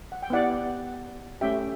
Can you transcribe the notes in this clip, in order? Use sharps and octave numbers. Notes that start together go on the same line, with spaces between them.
F#5
G5
B3 E4 G4 D5 F#5
A3 C#4 G4 E5 G5